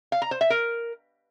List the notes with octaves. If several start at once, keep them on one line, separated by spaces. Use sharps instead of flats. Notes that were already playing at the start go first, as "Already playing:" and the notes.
F5
A#5
C5
E5
A#4